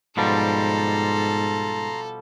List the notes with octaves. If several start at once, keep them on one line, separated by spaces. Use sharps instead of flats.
G#2 B2 F3 G3 A4 A#5 C6